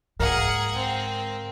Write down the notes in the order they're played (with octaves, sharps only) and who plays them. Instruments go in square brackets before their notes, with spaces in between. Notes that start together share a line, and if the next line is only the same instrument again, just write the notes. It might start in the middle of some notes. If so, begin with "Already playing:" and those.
[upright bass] G#2 D3 [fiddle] G#4 F#5 [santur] A#4 F5
[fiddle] C4